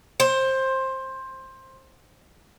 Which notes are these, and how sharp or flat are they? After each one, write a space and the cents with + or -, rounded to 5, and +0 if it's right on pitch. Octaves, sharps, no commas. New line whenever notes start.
C5 +15